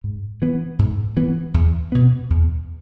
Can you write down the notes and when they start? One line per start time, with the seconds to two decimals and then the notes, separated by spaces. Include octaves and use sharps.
0.04 G#2
0.42 E3 B3
0.79 G#2
1.17 E3 B3
1.54 E2
1.92 B2 B3
2.30 E2